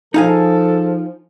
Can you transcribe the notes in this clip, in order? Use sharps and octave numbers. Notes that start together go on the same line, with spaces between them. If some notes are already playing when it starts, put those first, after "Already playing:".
F3 D#4 G#4 A4 F5 G#5